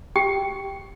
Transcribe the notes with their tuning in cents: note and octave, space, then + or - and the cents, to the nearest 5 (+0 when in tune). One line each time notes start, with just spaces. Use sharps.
G4 +0 G5 +0